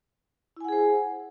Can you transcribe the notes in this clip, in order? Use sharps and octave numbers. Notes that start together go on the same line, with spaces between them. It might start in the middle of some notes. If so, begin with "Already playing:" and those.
E4 G#4 C5 F#5 G#5